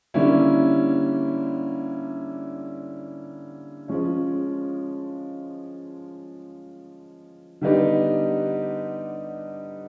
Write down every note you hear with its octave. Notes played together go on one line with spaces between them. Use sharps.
D3 G3 A#3 C#4 E4
F3 G#3 C#4
D3 G3 B3 D#4 G4